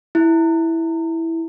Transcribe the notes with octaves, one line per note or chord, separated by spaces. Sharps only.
E4